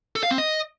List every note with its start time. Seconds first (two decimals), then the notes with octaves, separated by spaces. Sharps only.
0.16 A4
0.23 F5
0.31 C4
0.38 D#5